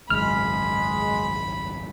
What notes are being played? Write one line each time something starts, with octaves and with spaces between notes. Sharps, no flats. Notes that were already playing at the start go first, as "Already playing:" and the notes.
G#1 C#2 F#2 G#3 B5 F6